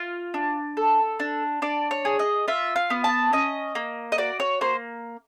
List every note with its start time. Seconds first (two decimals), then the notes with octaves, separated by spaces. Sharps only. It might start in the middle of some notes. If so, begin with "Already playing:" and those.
Already playing: F4
0.34 D4
0.77 A4
1.20 D4
1.62 D4 D5
1.91 C#5
2.05 G#4
2.19 D#5
2.48 F4 E5
2.76 F5
2.90 B3
3.04 A5
3.33 C#4 D#5
3.75 A#3
4.12 D#5
4.18 F#4 D5
4.40 C#5
4.61 A#3 C5